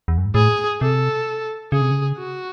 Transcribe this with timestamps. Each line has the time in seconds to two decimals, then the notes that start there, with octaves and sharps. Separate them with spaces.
0.08 E2
0.18 F#2
0.26 G#2
0.35 A2 G#4
0.81 C3 A4
1.72 C#3 G#4
1.81 C3
1.91 C#3
2.18 F#4